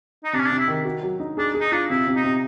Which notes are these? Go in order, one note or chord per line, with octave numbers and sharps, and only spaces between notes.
D#4
C3 D4
C#4
D4
C3
E4
D#3
F#4
F#3
D#4
D4 G#4
G#4
D#4
D4 F4
C3 E4
C3
D#4
C3